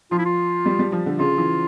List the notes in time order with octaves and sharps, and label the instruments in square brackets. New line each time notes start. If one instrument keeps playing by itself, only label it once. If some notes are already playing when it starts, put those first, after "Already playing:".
[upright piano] F3 [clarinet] F4
[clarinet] E4
F4
[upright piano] G3
G3
F3
D3
[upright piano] C#3 [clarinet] F4
[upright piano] E3